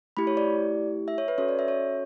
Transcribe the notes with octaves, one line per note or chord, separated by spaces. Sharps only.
A3 E4 G4 B5
C#5
D5
E5
C#5
B4
C#4 F#4 A4 C#5
D5
E5
C#5